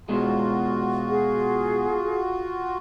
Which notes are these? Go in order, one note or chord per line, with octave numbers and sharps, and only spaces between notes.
B2 G#3 F4 F#4
G#4